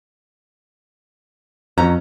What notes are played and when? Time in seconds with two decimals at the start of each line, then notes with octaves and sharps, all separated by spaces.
1.78 F2 C#4 A#5